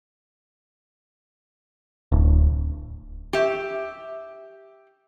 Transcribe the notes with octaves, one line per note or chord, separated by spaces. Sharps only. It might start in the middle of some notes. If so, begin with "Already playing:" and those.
D1
G4 E5